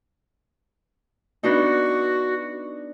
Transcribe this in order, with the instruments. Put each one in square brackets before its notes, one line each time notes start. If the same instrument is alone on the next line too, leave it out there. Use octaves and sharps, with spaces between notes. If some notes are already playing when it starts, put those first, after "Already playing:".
[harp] B3 D4 D#4 [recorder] F#4